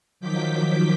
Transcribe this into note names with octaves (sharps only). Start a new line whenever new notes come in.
D#3 F3 F#3 D6 G6 B6